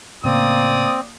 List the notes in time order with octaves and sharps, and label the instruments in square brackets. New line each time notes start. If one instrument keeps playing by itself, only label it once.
[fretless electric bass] A2 C#3 [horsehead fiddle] A#3 [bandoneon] C4 [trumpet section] D5 D#6